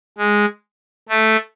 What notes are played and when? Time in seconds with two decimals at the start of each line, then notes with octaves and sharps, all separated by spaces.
0.18 G#3
1.09 A3